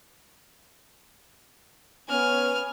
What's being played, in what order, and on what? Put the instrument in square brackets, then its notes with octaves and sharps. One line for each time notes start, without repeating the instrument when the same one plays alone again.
[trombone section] B3 C#4 [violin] G#5 F6